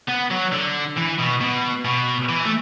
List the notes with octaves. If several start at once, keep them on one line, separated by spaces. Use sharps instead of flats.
B3
F#3
D3
E3
B2
B2
B2
E3
A3